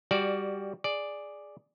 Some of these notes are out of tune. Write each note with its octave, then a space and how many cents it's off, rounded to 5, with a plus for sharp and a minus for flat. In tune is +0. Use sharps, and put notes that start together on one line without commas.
G3 +15 F#4 +20 D5 +0
G#4 +0 D5 +0